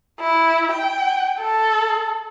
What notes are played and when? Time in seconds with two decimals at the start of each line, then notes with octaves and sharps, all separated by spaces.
0.20 E4
0.72 G5
1.39 A4